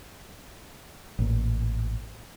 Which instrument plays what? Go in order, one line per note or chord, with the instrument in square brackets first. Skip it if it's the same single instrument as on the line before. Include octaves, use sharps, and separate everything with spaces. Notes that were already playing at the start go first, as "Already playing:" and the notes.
[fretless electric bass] A1 A#2